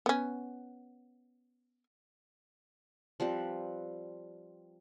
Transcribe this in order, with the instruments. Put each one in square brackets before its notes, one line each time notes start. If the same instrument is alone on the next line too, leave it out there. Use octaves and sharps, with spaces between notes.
[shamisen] B3 C#4
[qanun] F3 G3 C4 B4